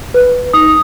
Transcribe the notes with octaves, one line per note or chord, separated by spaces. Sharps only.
B4
D#4 D#6